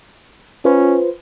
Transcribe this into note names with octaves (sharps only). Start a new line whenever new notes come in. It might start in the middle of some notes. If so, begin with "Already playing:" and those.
C#4 F4 B4 C5